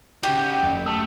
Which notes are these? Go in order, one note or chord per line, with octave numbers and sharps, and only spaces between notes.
C#3 D#4 F#4 G4 D6
F#1
A3 A5 E6